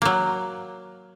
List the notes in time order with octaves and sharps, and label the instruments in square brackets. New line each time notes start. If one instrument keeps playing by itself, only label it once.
[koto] F#3 A#3